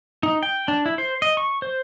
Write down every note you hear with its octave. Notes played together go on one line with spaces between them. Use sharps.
D#4
G5
D4
E4
C5
D#5
C#6
C5